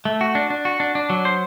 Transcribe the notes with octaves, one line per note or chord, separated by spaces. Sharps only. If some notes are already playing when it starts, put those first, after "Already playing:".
A3
F#4
D4
D4
F#4
D4
D4
F#3
C5